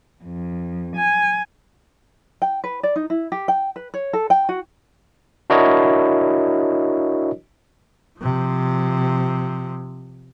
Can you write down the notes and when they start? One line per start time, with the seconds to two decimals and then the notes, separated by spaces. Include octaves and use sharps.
0.25 F2
0.96 G#5
2.42 G5
2.64 B4
2.83 D5
2.96 D#4
3.10 E4
3.32 G4
3.48 G5
3.76 B4
3.94 C#5
4.13 A4
4.30 G5
4.49 F#4
5.50 D4 E4 F#4 A#4 C#5 D#5
8.19 C3 F3